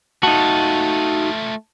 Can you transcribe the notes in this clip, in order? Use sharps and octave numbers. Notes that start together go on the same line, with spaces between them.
A3 D#4 F4 F#4 A5